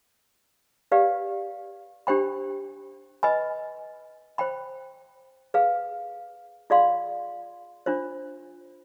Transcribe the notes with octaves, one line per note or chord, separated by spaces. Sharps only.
G4 B4 D5 F5
D4 G4 C5 G5 B5
B4 D#5 G#5 B5
C5 G5 B5
G#4 B4 F5
F4 G#4 D5 F5 C6
D4 F4 C5